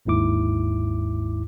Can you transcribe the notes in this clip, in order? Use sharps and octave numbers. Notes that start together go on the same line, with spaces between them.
G1 D#2 G#2 E4 D6